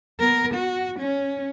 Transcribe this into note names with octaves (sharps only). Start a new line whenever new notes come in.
B3 A#4
F#4
C#4